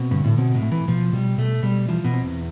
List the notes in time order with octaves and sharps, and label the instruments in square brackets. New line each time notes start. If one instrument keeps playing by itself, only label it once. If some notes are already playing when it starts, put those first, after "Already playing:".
Already playing: [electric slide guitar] B2 [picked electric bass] C4
[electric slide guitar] G2 [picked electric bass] D3
[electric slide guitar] A2
[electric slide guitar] B2 [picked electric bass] C4
[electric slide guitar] A2
[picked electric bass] A3
[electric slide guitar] E3
[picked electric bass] B2 [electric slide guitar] F3
[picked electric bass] B2 [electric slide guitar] G3
[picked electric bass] B2 [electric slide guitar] A3
[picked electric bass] B2 [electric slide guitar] G3
[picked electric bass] E3 [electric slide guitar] F3
[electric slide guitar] B2
[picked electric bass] C4
[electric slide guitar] E2